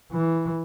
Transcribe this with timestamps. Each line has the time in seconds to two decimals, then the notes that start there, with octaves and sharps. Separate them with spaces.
0.12 E3